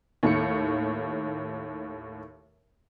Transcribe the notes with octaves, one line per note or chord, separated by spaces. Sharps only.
D#2 A2 C#7